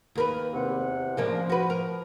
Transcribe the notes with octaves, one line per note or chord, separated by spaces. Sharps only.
D#2 A#4 B4
E2 C3 F#5
C#3 F3 A#3 D4
F#4 B4
A#4